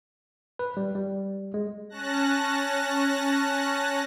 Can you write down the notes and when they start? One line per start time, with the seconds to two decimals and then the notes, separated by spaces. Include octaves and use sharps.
0.59 B4
0.77 G3
0.95 G3
1.54 G#3
1.89 C#4 A5 F#6 A#6